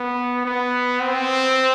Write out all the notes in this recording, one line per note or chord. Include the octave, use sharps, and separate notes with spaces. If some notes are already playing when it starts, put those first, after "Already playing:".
Already playing: B3
B3
C4